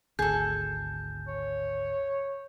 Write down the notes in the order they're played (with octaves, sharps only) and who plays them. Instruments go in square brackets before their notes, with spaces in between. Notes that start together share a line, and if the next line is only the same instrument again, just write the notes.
[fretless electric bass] G#1 D2 [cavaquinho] G#4 A4 [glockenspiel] G6
[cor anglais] C#5